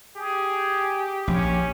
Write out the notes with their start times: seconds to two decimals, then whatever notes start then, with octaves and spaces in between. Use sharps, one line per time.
0.17 G4 G#4
1.28 A#1 C#4